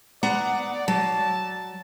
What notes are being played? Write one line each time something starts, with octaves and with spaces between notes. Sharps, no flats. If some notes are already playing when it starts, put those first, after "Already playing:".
B3 D5 F#5 A#5
F#3 A5